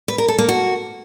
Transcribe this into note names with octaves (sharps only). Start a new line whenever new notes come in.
B4
A#4
A4
A#3
F#4